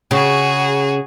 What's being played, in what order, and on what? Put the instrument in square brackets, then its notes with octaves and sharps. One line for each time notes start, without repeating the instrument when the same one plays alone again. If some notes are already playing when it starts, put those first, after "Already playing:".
[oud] C#3 [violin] F#4 G#4